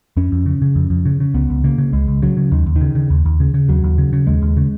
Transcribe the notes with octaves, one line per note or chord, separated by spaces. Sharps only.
F2 C#4
F2
C#3
C#3
F2
F2
C#3
C#3
C#2 B3
C#2
C#3 A#3
C#3
C#2 G#3
C#2
C#3 F#3
C#3
D#2 D#3
D#2
D#3
C#3
C#3
D#2
D#2
C#3
C#3
D#2 F#3
D#2
C#3
C#3
D#2 G#3
D#2
C#3